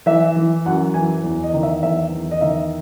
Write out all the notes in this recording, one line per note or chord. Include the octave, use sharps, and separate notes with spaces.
E3 E5
E3
F#2 F#5
E3 G#5
E2
D#5
D#3
E5
E2 E5
E2
D#5
D#3 E5